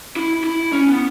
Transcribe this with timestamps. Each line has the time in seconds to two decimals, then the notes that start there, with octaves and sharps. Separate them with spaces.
0.16 E4
0.44 E4
0.72 C#4
0.88 B3